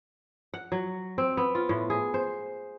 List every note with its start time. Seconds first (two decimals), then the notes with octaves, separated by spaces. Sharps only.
0.54 F#5
0.72 F#3
1.18 C4
1.37 B3
1.55 F4
1.69 A2
1.90 G#4
2.14 C5